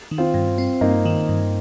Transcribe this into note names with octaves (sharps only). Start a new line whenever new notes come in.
D#3
C4 F4
G2
C4
G2 A#3 D#4
D#3
G2